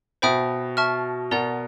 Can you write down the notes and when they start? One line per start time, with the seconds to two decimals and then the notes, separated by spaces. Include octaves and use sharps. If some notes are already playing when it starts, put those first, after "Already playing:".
0.22 B2 C5 E5 G5 B5 D#6
0.77 E5 A5 C#6 F6
1.31 B2 A#4 D5 F#5 A#5